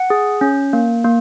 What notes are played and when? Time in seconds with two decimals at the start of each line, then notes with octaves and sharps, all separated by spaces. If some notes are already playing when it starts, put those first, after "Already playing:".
Already playing: F#5
0.10 G#4
0.41 C#4
0.73 A#3
1.05 A#3